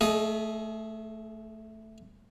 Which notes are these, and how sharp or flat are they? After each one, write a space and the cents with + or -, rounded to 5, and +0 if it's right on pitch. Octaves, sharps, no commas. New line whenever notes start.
A3 +0 G#4 +40 D#5 +0